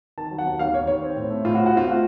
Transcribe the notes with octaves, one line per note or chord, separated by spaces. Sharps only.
D#3 A5
F#3
F#5
D#2
D#2 F5
D#2 C#5
D#2 C#5
C4
A2
A3
A2 F4
F#4
C4
F#4
C4 F4
A3 F#4